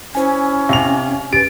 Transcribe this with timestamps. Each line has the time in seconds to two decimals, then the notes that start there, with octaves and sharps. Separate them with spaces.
0.15 C#4 E4 C5 G#5
0.69 C3 F5 F7
1.33 G4 B4 A6 D7